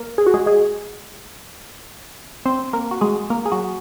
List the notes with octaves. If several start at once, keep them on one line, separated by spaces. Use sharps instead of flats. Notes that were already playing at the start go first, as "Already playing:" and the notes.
Already playing: A#3 A#4
G#4
F#4
G#3 G#4
G#3 G#4
C4 C5
A#3 A#4
F#4
G#3 G#4
A#3 A#4
G#4
F#3 F#4